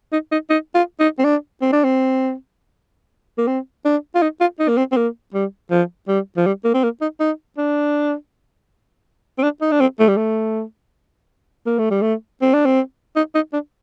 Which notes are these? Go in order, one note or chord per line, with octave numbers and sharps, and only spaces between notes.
D#4
D#4
D#4
F4
D#4
C4
D4
C4
D4
C4
A#3
C4
D4
F4
D#4
F4
D#4
A#3
C4
C4
A#3
G3
F3
G3
F3
G3
A#3
C4
A#3
D#4
D#4
D4
C4
D4
D#4
D4
C4
A3
G3
A3
A#3
A3
G3
A3
C4
D4
C4
D#4
D#4
D4